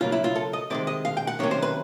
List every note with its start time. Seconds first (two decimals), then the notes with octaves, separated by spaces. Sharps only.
0.01 C#3 F#3 A#3 F4
0.12 E4
0.24 F4
0.35 A4
0.53 D#5
0.70 C3 D#3 G#3 D5
0.87 D#5
1.05 F5
1.17 G5
1.27 F#5
1.39 C3 D#3 F#3 A#3 C#4 C#5
1.51 C5
1.62 B4